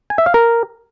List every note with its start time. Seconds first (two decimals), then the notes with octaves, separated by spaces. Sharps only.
0.10 G#5
0.18 E5
0.26 F5
0.34 A#4